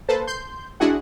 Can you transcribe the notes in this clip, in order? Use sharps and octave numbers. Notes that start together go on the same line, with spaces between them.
A#3 A4 B4 C5 A5
C6 G6
G#3 D4 E4 F#4 G#4 F#5